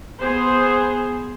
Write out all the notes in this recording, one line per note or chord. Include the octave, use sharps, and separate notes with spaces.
B3 G#4 C5